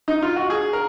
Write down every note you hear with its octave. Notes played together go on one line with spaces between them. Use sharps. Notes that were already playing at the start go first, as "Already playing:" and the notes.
D#4
F4
F#4
G#4
A#4